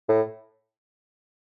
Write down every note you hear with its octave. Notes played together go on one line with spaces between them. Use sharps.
A2